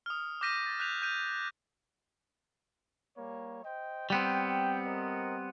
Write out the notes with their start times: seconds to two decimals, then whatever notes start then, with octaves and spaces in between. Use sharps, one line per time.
0.06 D#6 F6
0.41 D6 F6 G6 A#6 B6 D#7
0.66 A6
0.80 F#6 G6 B6 D#7 F7
1.02 G6 D#7 F7
3.17 G3 A#3 C#5
3.63 C5 D#5 G5
4.10 G3 B3 C4 G5
4.84 A#4 C5 D#5